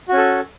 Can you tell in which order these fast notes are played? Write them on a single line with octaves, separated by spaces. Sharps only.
F#4 C#4 A4